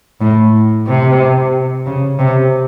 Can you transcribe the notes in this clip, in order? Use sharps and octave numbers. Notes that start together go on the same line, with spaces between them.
A2
C3
C#3
C3